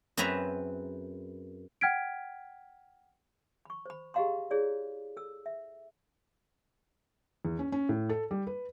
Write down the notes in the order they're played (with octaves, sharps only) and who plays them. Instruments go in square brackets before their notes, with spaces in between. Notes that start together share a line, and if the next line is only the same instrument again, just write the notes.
[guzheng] F#2 C4 G#4 B4 E5 A#5
[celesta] F#5 G5 F6 G#6 B6 D7
[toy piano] B5 C#6
C5 B5
G4 G#4 D#5 F5 A#5 C6
E4 G#4 C#5 D5
A4 E6
E5
[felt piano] E2
C#4
C#4
A2
A4
G3
B4